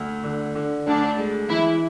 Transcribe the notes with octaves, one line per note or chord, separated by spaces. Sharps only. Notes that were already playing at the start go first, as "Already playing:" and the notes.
Already playing: D2
D3
D3
D2 D4
G#3
E3 E4